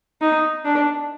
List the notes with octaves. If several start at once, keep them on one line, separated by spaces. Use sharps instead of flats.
D#4
D4